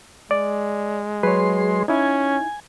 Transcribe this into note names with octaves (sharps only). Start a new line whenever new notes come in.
G#3 D5
F#3 G#4 B4 C#5 C6
C#4 D#4 E4 G#5